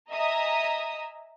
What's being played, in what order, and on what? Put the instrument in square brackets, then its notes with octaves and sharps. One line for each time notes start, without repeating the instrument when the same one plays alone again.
[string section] D#5 E5 G#5 A#5 D#6